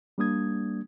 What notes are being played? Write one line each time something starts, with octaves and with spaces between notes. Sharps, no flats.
G3 A#3 D4 D#6 G#6